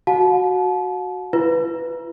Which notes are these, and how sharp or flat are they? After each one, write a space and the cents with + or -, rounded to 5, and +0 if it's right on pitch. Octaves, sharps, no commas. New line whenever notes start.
F#4 +0 F#5 -45 A5 -35
E4 +35 B4 +0